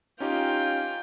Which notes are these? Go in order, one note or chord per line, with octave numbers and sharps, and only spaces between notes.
C#4 D#4 F4 G4 G5